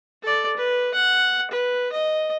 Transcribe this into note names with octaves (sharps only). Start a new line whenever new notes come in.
A4 D5
B4
F#5
B4
D#5